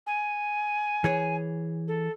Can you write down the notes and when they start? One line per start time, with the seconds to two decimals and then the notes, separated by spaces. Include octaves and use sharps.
0.06 G#5
1.04 E3 G#4 C#5
1.87 A4